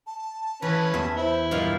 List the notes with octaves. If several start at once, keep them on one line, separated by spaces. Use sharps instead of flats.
A5
E3 C#4 B4
E2 E5
E4 C5
G2 A#2 D#5 F5